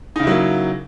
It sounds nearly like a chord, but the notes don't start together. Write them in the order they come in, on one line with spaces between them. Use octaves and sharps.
D#4 C#3 E4 F#3 A#3